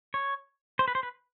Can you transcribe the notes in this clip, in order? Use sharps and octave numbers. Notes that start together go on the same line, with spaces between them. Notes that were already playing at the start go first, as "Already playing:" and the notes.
C#5
C5
B4
C5
B4